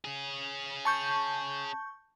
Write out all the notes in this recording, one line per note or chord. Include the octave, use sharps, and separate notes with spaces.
C#4 G#4
A5 C#6 G6